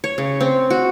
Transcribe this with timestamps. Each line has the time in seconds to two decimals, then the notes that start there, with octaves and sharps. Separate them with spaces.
0.04 C#5
0.18 C#3
0.40 C4
0.70 F#4